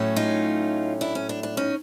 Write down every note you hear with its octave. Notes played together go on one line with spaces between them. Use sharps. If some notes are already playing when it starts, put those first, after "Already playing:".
Already playing: A2 F#3 A3 C#4
D#4 F4
D4 E4
C#4
D4
D4
C#4 D#4